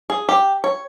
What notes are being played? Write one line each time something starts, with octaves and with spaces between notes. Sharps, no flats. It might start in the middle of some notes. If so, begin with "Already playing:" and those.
G#4
G4
C#5